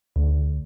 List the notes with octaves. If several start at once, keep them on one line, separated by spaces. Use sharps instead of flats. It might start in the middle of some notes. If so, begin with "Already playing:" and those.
D2